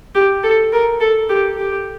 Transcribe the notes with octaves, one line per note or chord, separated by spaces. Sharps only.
G4
A4
A#4
A4
G4
G4